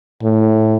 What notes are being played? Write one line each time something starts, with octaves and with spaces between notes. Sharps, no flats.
A2